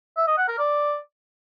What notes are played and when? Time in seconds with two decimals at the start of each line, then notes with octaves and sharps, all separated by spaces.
0.17 E5
0.27 D#5
0.38 F#5
0.48 A#4
0.59 D5